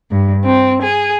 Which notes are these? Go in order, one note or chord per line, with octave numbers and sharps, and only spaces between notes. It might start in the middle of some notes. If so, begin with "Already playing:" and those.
G2
C4
G#4